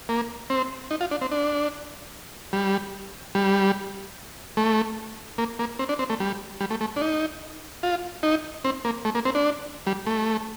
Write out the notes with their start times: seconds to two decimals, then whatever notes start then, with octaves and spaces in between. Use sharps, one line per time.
0.09 A#3
0.50 C4
0.91 D#4
1.01 F4
1.11 D4
1.22 C4
1.32 D4
2.53 G3
3.35 G3
4.57 A3
5.38 A#3
5.59 A#3
5.79 C4
5.89 D4
5.99 C4
6.10 A3
6.20 G3
6.61 G3
6.71 A3
6.81 A3
6.96 D4
7.01 D#4
7.83 F4
8.23 D#4
8.64 C4
8.85 A#3
9.05 A3
9.15 A#3
9.25 C4
9.35 D4
9.87 G3
10.06 A3